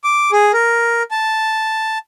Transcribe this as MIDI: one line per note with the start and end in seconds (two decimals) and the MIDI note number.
0.04 0.31 86
0.32 0.52 68
0.54 1.03 70
1.11 1.98 81